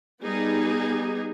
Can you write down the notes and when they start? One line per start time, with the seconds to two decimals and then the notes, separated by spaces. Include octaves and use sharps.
0.23 G3 B3 D#4 G#4